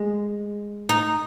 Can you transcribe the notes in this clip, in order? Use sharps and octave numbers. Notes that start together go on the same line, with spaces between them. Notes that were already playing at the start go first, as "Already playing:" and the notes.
Already playing: G#3
D#4